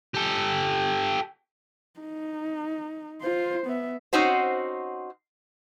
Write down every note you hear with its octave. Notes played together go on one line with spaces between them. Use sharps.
G4 A4
D#4
F4 C5
B3 E5
C4 C#4 D#4 F#4 C5